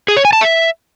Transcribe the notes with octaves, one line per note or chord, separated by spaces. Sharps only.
G#4
C#5
G#5
A5
E5